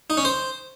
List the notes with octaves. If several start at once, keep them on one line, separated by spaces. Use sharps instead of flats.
D#4
C#4
C5